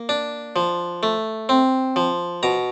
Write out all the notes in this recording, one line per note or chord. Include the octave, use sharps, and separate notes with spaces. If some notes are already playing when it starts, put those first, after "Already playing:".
Already playing: A#3
D4
F3
A3
C4
F3
B2 A#5